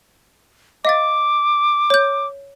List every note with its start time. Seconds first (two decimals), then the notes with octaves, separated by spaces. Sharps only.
0.85 D#5 F5 D6 A6
1.90 C#5 G6